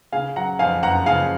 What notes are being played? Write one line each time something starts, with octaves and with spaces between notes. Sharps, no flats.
C#3 F5 G#5
F#3 F#5 A#5
F2 F5 G#5
F#1 F#5 A#5
C#3 F5 G#5